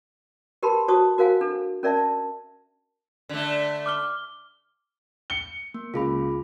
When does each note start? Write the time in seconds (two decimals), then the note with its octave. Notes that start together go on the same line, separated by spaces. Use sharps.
0.63 G4 A#4 B4 A5 B5 C6
0.88 F#4 C5 A5 C#6 D#6
1.18 F#4 A#4 C5 F5 F#5 G#5
1.41 D4 A4
1.83 C#4 A#4 D5 E5 A5
1.97 A5
3.29 D3 A3
3.86 D6 F6 G7
5.30 C#7 G7
5.74 A#3
5.94 C#2 F4 G#4 B5